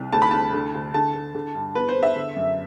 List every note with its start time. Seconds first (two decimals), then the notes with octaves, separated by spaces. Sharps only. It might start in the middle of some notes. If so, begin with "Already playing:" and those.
Already playing: C2
0.12 D2 A5
0.22 B5
0.31 D2 A5
0.53 D3
0.74 D2
0.94 D3 A5
1.14 D3
1.35 D3
1.55 G2
1.75 E2 B4
1.89 C5
1.95 E2
2.03 E5
2.16 D3
2.36 F#2